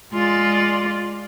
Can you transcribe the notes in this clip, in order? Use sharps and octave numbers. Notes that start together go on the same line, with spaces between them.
G#3 F4 D5